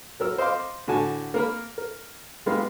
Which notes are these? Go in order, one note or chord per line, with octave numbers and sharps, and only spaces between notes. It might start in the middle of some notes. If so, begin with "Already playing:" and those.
F#3 A#4 E6
C5 D#5 F5 C6 D6
A2 D3 F#4 G#5 A5
A#3 A#4 B5
A#4
G3 G#3 A#3 B3 B4 F5